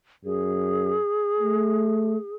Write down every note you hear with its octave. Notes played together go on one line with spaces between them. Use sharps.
F#2 G#4
A3